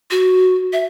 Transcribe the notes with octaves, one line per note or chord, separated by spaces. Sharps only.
F#4
E5